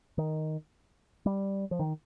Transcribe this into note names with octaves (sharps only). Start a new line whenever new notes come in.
D#3
G3
F3
D#3